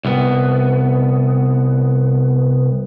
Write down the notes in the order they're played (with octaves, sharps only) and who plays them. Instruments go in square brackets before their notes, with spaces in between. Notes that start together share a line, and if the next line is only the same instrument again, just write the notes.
[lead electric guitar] C2 B3